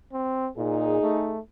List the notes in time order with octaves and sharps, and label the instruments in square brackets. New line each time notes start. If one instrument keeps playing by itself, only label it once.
[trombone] C4
[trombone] A#2 [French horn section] D#4 G#4
[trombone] A3